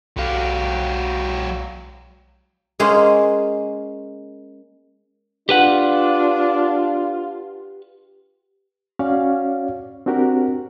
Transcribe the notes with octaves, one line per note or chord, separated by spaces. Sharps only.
B1 F#3 G4 F5
G#3 A#3 C#4 G#4 C5
D4 F4 G4 B4 F#5
C#4 F#4 C#5 D5 F5
C4 D4 F#4 G4 A#4